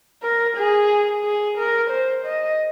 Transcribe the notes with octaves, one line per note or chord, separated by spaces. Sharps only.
A#4
G#4
G#4
A#4
C5
D#5